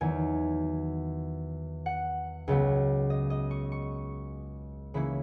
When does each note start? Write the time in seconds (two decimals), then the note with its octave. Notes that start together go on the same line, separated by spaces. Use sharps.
0.01 E2 D#3 F#3 G#5
1.86 F#5
2.48 C#2 C#3 F#3 B3
3.10 D#5
3.30 D#5
3.51 C#6
3.72 C#6
4.94 C#3 E3 A#3 C#4 E4 B5